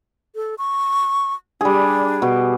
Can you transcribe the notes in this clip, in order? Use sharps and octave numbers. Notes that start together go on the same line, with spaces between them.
A4
C#6
G3 D4 G#4
B2